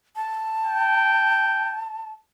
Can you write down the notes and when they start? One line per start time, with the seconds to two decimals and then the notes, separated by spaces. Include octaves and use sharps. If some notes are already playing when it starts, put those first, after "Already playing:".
0.16 A5
0.66 G5